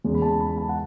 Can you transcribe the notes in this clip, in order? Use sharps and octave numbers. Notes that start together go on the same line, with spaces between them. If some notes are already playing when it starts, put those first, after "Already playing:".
E2 C#3 G#3
B5
A5
B5
A5
F#5